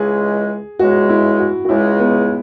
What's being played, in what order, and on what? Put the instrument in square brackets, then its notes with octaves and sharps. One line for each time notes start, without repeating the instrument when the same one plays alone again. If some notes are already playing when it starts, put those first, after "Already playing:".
Already playing: [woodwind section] C#2 C#3 E3 G#3 [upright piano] G#4
[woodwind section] C#2 C#3 E3 G#3 [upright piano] F#4
[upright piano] E4
F#4
F#4
[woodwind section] C#2 C#3 E3 G#3 [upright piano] E4
[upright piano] B3